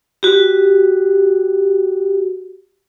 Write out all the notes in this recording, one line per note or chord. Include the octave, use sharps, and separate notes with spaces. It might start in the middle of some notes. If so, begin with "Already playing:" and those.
F#4 G4